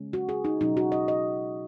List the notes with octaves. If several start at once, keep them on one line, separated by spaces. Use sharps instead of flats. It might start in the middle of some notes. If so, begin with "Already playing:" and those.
Already playing: C#3 G#3 C#4
F#4
G#4
D#4
B2 F#3 C#4 D#4
F#4
D#5
D#5